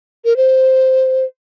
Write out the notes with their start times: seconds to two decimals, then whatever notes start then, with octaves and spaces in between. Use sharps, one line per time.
0.25 A#4
0.37 C5